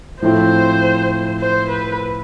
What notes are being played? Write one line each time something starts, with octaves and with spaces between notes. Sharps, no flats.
A2 F3 A3 C4 E4 C5
C5
B4